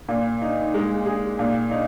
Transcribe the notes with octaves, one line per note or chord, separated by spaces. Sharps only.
A#2
D#4
G#3
G#4
A#2
D#4